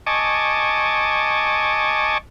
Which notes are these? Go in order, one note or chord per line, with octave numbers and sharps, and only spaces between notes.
D#5 G#5 A5 C#6 D6